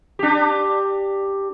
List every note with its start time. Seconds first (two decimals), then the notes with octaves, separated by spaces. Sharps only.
0.19 D4 G4